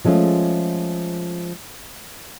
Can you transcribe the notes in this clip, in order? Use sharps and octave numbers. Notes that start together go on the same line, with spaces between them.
F3 G#3 A3 C#4 F4